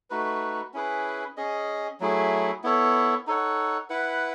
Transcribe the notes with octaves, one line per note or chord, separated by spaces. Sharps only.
A3 D#4 F#4 B4
C#4 E4 G#4 B4
C#4 G#4 D#5
F#3 A3 E4 G#4
B3 E4 A4 C#5
D#4 A4 C#5 F#5
E4 B4 F#5